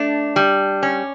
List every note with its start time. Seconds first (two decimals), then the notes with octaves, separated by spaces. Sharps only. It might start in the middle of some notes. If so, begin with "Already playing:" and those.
Already playing: A3 D4
0.36 G3
0.83 C#4